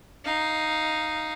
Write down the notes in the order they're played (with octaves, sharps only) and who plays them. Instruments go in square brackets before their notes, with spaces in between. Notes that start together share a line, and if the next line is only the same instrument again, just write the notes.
[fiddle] D#4 F5